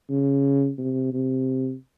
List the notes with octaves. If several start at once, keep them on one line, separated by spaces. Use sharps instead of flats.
C#3
C3
C3